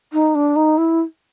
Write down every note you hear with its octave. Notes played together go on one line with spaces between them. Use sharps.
D#4
D4
D#4
E4